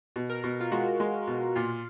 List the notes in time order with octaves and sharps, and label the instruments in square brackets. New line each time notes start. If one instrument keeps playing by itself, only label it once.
[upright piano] B2
[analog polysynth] A#4
[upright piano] B2
[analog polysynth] F4
[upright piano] G#3 [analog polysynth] F#4
[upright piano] G#3
B2
[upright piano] A#2 [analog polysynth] F4